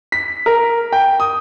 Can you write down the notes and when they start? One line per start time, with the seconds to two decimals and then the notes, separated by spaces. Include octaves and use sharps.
0.12 B6
0.46 A#4
0.93 G5
1.20 D#6